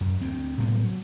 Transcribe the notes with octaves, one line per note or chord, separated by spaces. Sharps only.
F#2
D2 C4
F#1 A2 G3 B3
F#3